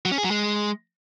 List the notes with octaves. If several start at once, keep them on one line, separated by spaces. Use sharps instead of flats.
F#3
C#4
G#4
F#3
G#3